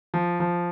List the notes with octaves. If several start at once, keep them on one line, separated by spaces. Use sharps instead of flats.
F3
F3